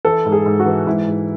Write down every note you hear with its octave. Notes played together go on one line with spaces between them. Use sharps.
E3 A4
G#2
G#4
G#2
F#4
E3
G#2 E4
G#2